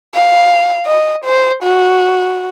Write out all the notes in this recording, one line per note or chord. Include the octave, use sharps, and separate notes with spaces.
F5
D#5
C5
F#4